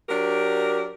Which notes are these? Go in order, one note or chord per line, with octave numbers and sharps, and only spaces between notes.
F#3 D4 G4 A#4